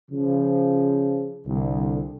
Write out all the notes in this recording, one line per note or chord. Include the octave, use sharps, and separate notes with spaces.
C#3 F3
C2 D3